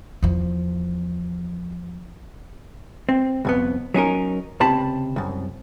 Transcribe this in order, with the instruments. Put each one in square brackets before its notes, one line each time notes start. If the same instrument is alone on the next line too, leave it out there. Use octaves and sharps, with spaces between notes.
[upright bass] E2 F3
[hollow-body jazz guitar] C4
C2 F2 B3
F#3 C#4 D#4 A#4
C#2 C3 A5 B5
C2 F#2